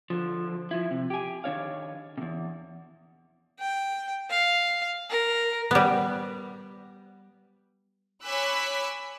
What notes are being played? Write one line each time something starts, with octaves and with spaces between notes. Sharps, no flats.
D3 F3
F3 E4
C3
G4 G#5
D#3 D4 C#5 F5
E2 C3
G5
F5
A#4
G3 B3
C#5 G#5 B5 D6 E6 F#6